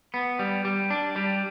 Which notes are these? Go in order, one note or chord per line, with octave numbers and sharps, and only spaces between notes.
B3
G3
G3
D4
G3